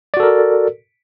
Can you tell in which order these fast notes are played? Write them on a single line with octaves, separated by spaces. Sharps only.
D5 F#4 A4 A#4